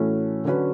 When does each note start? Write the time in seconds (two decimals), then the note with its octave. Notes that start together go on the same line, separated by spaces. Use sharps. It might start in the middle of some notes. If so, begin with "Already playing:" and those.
Already playing: A2 E3 A3 C#4 F#4
0.45 D3 F#3 C#4 F#4 B4